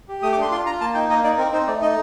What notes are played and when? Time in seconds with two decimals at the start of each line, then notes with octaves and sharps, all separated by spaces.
0.08 G4
0.22 A3 D#6
0.33 D6
0.37 D4 C6
0.51 F4 C6
0.66 F4 A#5
0.81 A#3 A5
0.94 D#4 G5
1.09 A#3 D#5
1.24 D#4 D5
1.38 C4 A#4
1.53 D#4 C5
1.67 A3 D5
1.81 D#4 D#5